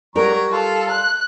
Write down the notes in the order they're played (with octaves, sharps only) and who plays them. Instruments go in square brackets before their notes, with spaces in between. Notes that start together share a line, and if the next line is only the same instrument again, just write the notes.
[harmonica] F#3 A#5 C#6 [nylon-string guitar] G3 A#4
[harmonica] F4 [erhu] A4
[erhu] F#6